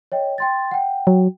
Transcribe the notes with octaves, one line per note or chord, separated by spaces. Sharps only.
C#5 D#5 G5
G5 C6 A6
F#5 G5
F#3